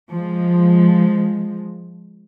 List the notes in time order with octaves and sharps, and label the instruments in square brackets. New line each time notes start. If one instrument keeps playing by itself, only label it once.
[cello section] F3 G#3